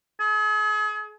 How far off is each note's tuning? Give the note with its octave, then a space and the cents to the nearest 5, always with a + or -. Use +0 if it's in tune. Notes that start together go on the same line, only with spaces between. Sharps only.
G#4 +40